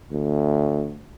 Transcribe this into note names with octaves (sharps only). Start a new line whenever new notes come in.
D2